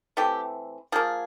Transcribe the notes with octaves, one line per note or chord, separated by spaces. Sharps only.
E3 A3 C4 G4
F3 A#3 G#4